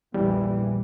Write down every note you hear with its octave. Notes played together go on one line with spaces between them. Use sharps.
A#1 E2 E3 G3